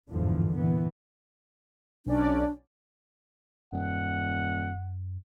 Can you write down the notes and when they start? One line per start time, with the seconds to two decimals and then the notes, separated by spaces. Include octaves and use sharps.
0.11 G1 E2 G#2 D3 E3 F3
0.55 A#2 E3 B3
2.06 B1 C#4 D4 D5
3.73 D#1 F#2 F#5